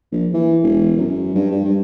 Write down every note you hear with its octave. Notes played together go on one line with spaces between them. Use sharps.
A#1
E3
E1
F#2
G2
G2
G2